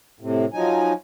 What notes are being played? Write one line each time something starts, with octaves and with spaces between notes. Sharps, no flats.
A2 C3
F3 F#3 D#4 G#5